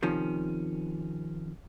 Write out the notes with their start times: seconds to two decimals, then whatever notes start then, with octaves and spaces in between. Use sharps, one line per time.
0.02 C3 D#3 F3 C#4